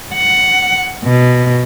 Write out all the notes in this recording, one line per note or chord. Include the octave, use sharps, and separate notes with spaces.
F#5
B2